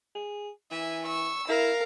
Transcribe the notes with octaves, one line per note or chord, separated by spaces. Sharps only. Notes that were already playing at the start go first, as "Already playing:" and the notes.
G#4
E3 E5 G#5
C#6 E6
E4 A#4 F5